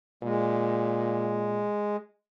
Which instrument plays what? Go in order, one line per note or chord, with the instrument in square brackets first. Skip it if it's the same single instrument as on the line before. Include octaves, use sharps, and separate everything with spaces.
[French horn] A#2 [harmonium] G#3